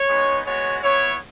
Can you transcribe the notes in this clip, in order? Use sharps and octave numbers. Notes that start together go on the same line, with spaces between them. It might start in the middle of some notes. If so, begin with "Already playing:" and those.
Already playing: C#5
G#3 B3 D#4
G#3 B3 F#4 C#5
B3 E4 C#5